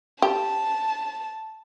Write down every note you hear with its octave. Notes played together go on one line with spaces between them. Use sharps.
G4 A5